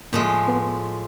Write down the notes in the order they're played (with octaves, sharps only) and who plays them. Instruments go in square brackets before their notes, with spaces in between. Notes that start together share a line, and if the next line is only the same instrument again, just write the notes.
[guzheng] A2 F3 G#3 [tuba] A#3
[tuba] B3